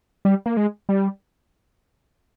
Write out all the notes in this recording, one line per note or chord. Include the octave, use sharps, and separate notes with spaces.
G3
A#3
G#3
G3